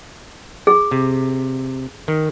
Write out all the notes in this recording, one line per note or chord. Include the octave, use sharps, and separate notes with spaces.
G#4
C3
D#3